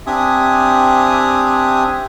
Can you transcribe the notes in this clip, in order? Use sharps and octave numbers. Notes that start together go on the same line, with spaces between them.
C4 D4 G4 E5 G#5 D#6